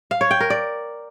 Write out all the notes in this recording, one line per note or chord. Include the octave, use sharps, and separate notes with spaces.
F5
C#5
G5
A#4
D5